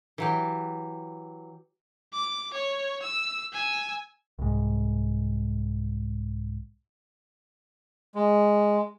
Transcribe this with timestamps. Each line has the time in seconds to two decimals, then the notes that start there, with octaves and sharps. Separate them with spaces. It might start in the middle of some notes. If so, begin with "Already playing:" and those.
0.18 E3 F#3 G4
2.13 D6
2.53 C#5
3.02 E6
3.52 G#5 E6
4.39 C2 G#2
8.15 G#3